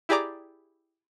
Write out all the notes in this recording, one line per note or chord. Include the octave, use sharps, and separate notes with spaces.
E4 G4 G#4 D5 A#5 D6